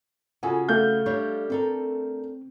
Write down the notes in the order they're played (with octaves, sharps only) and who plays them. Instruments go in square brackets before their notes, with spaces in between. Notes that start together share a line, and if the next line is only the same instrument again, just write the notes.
[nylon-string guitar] C#3 F#4 A4 [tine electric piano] F4 [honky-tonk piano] G#5
[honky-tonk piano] A3 G6 [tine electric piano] F5 F6
[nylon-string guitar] G3 D4 C#5
[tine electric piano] C4 [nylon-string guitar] D4 A4 A#4